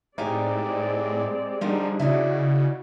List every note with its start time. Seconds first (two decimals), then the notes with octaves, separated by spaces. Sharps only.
0.18 A2 G#3 C4 D#4 G4 G#4 D5
1.61 D3 F3 G3 D4 D#4 G#4 A#4
1.99 C#3 E4 F#4 D5 D#5